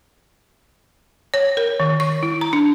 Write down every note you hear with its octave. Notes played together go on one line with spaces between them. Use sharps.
C#5
A#4
D#3
C#6
E4
A#5
D4